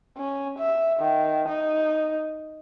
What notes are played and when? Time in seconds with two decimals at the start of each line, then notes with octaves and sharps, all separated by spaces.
0.17 C#4
0.59 E5
1.00 D#3
1.49 D#4